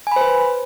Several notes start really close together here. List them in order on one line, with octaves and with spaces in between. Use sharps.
G#5 B5 C5 B4